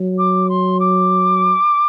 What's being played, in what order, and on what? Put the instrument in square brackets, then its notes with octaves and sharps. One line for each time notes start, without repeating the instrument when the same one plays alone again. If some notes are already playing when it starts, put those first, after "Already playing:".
Already playing: [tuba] F#3
[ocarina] D6
C6
D6